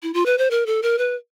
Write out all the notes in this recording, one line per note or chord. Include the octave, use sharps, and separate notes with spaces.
E4
F4
B4
C5
A#4
A4
A#4
B4